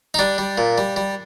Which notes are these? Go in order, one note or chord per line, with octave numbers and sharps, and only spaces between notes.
D#4
G3 D4
G3
A#2
G3
G3